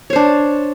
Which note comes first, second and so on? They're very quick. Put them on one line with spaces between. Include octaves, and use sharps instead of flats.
C#5 C5 D4